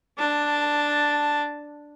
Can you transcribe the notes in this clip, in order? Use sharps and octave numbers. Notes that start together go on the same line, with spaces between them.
D4 A5